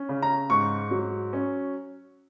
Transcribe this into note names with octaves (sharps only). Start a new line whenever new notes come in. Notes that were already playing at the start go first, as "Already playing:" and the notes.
Already playing: C#4
C#3
A#5
G#2 C#6
F#3
C#4